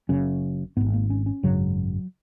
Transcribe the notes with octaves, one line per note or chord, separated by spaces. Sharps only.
F#1 F#2 C#3 C#4
G#1 G#2 B3
A#3
C#4
C#4
G#1 F#2 C#3 F#3